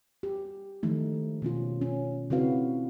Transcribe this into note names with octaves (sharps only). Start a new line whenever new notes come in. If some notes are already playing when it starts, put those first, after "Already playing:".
G4
D#3 F3 G#3 A3 D#4
B2 F3 C#4 F4
C#4
C#3 C4 E4 F#4 B4 F5